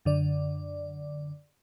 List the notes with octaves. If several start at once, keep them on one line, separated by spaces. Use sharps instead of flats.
F#2 D3 D5